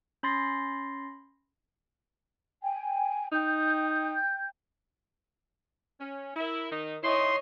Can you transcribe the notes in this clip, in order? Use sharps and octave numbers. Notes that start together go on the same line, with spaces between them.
C#4 B5 C6 A6 A#6 C7
G5 G#5
D#4 G5 G6
C#4
E4 A#4
D#3 D#4
E3 D#4 E4 C#5 D#5 C6